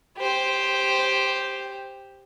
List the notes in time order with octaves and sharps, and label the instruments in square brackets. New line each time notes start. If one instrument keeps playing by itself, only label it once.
[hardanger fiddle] G4 C5